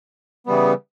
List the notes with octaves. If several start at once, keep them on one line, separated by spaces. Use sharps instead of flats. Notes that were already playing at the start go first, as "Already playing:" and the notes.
C#3 E3 G3 B3